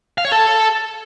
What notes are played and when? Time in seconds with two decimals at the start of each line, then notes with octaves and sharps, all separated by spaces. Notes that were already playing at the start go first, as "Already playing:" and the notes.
0.18 F5
0.25 C#5
0.32 A4